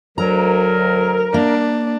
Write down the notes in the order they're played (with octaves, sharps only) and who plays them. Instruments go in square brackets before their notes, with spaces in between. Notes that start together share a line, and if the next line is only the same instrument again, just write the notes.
[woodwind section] D2 F#3 [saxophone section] A#4 [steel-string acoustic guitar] A#5
[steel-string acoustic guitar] A#3 [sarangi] D4